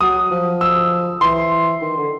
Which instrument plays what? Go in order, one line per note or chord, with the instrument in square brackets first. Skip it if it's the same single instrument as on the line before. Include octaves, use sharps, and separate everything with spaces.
[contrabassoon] F#3 [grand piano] D#6
[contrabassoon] F3
[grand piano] E6
[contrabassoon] E3 [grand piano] C6
[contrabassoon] D#3
D3